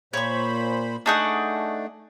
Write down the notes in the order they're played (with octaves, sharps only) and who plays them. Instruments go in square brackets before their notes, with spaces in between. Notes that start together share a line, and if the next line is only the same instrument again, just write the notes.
[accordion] A#2 C5 B5 [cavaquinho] C#5 C#6
[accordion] A3 [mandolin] D4 D#4 F#5 [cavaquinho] G#4 C#6 D#6